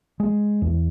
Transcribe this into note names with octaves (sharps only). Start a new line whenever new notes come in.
G#3
E2